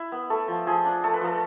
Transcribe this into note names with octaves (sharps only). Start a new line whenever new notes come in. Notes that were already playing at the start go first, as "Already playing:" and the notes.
Already playing: E4
B3
A3 A4
F3
F3 G#4
D4
A3 A4
B4
F3 A4